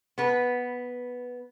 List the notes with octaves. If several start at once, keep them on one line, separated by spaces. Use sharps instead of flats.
B3 B4